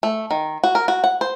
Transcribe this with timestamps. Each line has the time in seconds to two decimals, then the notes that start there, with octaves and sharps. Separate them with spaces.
0.03 A3
0.31 D#3
0.64 F#4
0.75 A#4
0.88 F#4
1.04 F#5
1.21 C5